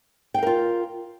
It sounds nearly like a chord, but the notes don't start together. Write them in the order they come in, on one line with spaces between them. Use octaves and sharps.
G5 F5 A#4 F4